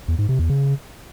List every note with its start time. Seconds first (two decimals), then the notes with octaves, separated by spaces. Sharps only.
0.08 E2
0.19 G#2
0.29 C3
0.39 E2
0.49 C#3